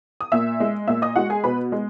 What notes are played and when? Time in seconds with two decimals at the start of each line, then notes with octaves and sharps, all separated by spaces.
0.21 D#6
0.32 A#2 E5 E6
0.60 G#3
0.88 A#2 E5 E6
1.02 D#5 D#6
1.16 G#3 F#4 F#5
1.30 G#4 G#5
1.44 B2 B4 B5
1.72 G#3